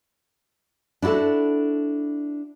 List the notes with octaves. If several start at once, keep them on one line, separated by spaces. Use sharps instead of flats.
D4 E4 F#4 A4